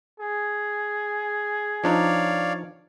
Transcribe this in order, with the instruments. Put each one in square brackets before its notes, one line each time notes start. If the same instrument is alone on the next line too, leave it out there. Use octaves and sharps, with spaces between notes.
[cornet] G#4
[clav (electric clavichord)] F3 D4 D#4 [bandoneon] C#5 D5 F5